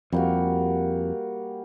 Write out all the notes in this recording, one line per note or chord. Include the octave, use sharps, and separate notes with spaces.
F2 G3 A#3 F#4